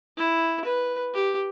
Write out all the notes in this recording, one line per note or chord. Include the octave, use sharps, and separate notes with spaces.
E4
B4
G4